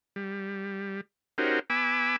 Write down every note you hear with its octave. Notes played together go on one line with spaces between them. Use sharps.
G3
C#4 D#4 F#4 G4 A#4 C5
B3 G#5 B5 D6 E6